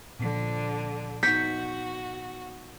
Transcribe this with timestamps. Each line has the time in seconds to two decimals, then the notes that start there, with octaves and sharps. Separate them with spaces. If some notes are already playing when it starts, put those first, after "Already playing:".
0.19 A#2 D3 F3
1.23 B3 D#4 F#4 G6 B6 C#7